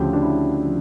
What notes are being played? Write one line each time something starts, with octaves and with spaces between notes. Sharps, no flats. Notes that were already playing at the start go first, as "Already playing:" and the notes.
Already playing: D2 C#3 F3 G4
D4
E4
C#3 F3